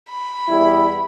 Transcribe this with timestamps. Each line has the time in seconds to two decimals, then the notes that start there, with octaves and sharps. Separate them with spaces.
0.10 B5
0.48 E2 G3 E4